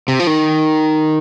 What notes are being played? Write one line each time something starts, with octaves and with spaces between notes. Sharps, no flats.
C3
F3
D#3